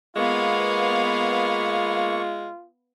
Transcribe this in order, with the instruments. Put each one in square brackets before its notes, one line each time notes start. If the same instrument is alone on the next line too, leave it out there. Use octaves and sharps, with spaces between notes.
[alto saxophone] G#3 [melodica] A#3 C#6 [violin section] B3 B4 F5 [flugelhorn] F4